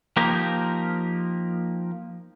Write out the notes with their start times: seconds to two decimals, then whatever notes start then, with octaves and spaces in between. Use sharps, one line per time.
0.17 F3 A#3 D#4 G4 A#4